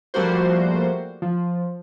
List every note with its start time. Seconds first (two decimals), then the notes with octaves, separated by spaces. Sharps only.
0.14 F3 G3 A3 A#3 F#4 C5
1.22 F3